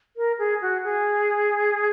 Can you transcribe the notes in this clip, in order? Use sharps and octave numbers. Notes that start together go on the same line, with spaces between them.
A#4
G#4
F#4
G#4